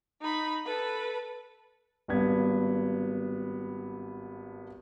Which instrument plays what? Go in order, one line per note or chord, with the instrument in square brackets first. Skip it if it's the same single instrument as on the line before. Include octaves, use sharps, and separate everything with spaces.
[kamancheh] D#4 B5
A4 B4
[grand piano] G#1 G2 B3 G#6